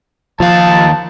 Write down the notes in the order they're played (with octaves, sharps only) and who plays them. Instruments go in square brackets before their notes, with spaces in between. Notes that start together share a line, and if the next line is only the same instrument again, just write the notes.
[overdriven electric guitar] D#2 F5 [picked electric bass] F3 [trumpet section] A5